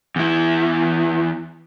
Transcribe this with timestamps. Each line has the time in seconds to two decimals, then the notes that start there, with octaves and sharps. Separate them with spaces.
0.16 E2 E4